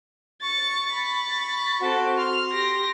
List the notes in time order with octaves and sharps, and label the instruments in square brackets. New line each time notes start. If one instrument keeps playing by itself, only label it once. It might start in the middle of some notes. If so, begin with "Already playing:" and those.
[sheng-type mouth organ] C#6 [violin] A6 C#7
[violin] B5 A6
[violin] C4 A4 [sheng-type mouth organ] F#4
[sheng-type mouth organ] C6 [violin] F6
[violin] G4 A#6